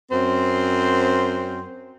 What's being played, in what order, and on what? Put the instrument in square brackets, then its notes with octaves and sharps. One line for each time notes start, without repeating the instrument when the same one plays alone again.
[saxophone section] F#2 C4 C5